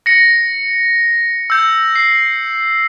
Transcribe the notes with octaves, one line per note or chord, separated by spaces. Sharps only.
A#6 C#7
E6 G6
C7